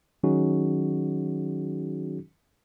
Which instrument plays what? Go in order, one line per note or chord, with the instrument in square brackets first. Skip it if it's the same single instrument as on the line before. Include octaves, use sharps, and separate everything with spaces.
[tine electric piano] D#3 F#3 C#4 D#4 F#4 G#4